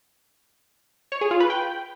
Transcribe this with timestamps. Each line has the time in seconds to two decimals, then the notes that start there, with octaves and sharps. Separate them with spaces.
1.12 C#5
1.21 G#4
1.31 F4
1.40 B4
1.50 G5